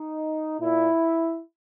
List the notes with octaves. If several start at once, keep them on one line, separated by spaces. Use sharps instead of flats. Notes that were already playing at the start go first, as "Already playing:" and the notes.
Already playing: D#4
A#2 E4